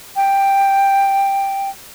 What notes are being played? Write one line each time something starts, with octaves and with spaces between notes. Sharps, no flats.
G5